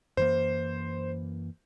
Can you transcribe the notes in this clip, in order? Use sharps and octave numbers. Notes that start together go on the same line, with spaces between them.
F#2 E3 A#3 C5